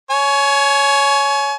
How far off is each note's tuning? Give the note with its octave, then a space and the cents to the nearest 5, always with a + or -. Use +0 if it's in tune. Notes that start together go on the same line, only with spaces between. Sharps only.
C#5 +10 G#5 +35